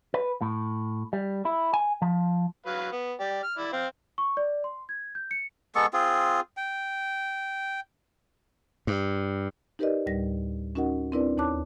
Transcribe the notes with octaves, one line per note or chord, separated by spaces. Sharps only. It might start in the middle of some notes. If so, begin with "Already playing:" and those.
B4
A2
G3
E4
G#5
F3
F#3 B4 F5
B3
G4 D5
F6
E4 D5
C4 C5 F5
C#6
D5
C6
G#6
G6
C#7
G#3 B3 A4 C#6
C4 F4 G#4
G5
G2
D#4 G4 A#4 B4 D5 D#5
D2 A2 G3 A#6
C#4 D#4 F#4 A#4 D#5 F#5
C4 D4 E4 A#4 B4 D5
D#2 D#4 C#5 A5 D6 F#6